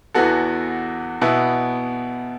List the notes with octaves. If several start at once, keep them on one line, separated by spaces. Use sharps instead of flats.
E2 E3 B3 F#4 A4
B2 B3 E4